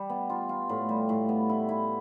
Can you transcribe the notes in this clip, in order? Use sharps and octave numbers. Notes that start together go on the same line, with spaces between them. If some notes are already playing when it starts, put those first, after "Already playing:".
Already playing: G3
B3
F4
F4
A2
G3
A2
B3
E4
E4